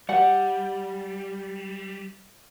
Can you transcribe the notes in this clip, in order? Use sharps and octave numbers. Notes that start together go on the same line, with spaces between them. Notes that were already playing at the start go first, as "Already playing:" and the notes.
G3 F#5